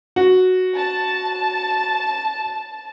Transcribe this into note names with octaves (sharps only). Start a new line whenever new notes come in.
F#4
A5